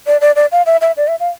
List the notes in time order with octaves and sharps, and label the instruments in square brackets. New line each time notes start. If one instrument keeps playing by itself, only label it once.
[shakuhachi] D5
D5
D5
F5
E5
E5
D5
E5
F5